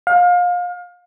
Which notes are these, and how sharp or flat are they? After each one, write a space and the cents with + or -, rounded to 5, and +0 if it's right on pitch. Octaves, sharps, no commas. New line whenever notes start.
F5 +30